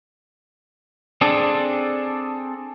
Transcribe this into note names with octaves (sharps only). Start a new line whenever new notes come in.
C4 D4 G#4 A4